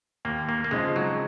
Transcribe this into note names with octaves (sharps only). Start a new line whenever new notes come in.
D#2 A#3
A#3
A#3
C#3 F3 G#3 C4 D#4
F#3